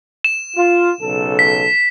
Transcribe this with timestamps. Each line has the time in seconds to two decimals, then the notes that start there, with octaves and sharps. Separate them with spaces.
0.25 E7
0.56 F4
1.01 B1 C#3 A4
1.39 B6